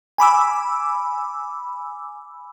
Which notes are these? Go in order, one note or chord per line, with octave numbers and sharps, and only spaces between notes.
G#5 B5 D6 E6